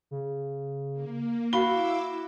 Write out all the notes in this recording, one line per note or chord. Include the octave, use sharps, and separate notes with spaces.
C#3
A#3
E4 F#4 F5 B5 D6 E6 G7